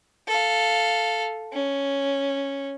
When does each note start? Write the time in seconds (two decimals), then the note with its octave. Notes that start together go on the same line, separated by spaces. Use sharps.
0.28 A4 F5
1.53 C#4